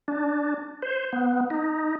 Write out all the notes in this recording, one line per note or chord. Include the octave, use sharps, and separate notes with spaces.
D4
C5
B3
D#4